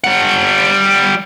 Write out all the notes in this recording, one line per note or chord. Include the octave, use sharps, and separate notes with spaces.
G3 F#5